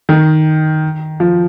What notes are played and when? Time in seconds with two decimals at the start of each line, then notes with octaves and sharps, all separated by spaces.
0.09 D#3
1.20 F3